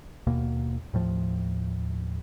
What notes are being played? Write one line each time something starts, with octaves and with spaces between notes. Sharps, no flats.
D#2 B2 A#3
D#2 A2 F3